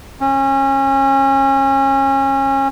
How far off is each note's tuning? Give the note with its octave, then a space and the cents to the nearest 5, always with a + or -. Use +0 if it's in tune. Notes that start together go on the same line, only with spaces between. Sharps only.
C#4 -30